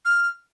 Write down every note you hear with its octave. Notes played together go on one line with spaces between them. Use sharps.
F6